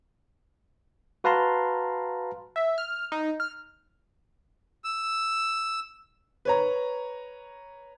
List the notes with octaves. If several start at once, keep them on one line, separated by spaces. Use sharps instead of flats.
F#4 B4 F5 A5 A#5 C6
E5
F6
D#4
F6
E6
B4 C#5 A#5